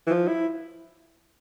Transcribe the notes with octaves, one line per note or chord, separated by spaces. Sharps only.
E3
F3
E4